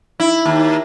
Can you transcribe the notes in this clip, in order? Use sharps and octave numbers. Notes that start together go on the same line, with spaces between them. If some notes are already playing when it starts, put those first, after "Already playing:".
E4
D#2